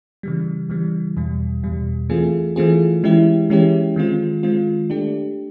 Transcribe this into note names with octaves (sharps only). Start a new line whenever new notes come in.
C#3 E3 G3
C#3 E3 G3
E2 B2 G3
E2 B2 G3
E3 A3 C4 F4 G#4
E3 A3 C4 F4 G#4
E3 G#3 C#4 E4 G4
E3 G#3 C#4 E4 G4
D#3 G#3 C4 F4
D#3 G#3 C4 F4
A3 D4 G4